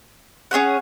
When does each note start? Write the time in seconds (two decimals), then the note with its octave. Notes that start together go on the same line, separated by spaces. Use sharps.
0.51 C#4 G#4 C#5 F#5